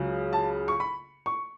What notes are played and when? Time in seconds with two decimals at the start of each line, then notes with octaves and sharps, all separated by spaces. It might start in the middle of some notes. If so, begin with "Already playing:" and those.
Already playing: C#2 C#3 F#3
0.33 A5
0.68 C#6
0.80 B5
1.26 C#6